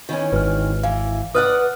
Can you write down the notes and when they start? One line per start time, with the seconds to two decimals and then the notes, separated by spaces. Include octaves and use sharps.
0.09 D#3 E3 C#4
0.32 G#1 B4 F6
0.83 E3 F5
1.35 B4 D5 F#5 D#6 F6 F#6